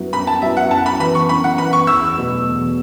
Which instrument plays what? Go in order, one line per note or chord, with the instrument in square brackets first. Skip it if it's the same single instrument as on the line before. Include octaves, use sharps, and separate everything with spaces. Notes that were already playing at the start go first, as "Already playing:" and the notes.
Already playing: [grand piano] F#2 F#3 B3 E4
[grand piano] F#2 [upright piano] B5
[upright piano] A5
[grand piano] F#3 B3 E4 [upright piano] E5
[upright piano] F#5
[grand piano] F#2 [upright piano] A5
[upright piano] B5
[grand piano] E3 B3 E4 [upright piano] B5
[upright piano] C#6
[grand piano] F#2 [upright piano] B5
[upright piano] F#5
[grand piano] E3 B3 E4 [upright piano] B5
[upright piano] C#6
[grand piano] E2 [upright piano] E6
[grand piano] B2 F#3 A3
E2